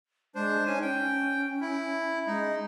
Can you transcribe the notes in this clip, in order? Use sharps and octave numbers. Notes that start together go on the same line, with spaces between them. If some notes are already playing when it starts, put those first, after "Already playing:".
G#3 D4 C5
C#4 D#4 G#5
C#4 G5
E4
G#3 D#4